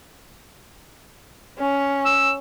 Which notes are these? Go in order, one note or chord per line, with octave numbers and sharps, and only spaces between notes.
C#4
E6